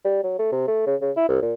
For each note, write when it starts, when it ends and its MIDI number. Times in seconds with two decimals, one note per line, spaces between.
0.04 0.23 55
0.23 0.34 54
0.39 0.51 57
0.52 0.66 48
0.68 0.85 57
0.86 0.95 49
1.01 1.11 49
1.17 1.28 64
1.28 1.41 36
1.42 1.54 46